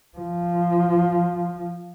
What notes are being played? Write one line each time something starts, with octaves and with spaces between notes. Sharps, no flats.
F3